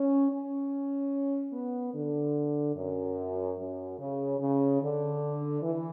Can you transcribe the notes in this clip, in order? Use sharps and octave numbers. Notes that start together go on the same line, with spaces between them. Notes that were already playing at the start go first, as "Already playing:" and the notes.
Already playing: C#4
C#4
B3
D3
F#2
F#2
C#3
C#3
D3
E3